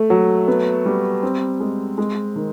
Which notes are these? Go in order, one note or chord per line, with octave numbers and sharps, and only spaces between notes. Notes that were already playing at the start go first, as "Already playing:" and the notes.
Already playing: A3
F#3
B3
G3
C4
G#3
G#3
D#3